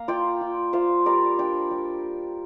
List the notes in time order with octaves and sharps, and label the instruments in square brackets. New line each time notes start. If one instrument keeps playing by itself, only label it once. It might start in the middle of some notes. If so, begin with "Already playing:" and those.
Already playing: [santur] A#3 F5 A#5
F4 D5 G5
F4
F4 C5 F5
G3 A#4 D5
D4 D5 G5
G3